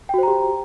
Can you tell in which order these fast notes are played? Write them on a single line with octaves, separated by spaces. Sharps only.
G5 F#4 C5 A#5 G4